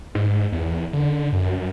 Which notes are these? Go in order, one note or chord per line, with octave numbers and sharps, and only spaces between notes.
G#2
E2
D3
F#2